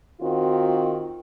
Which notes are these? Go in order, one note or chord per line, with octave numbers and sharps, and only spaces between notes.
D#3 C4 F4 F#4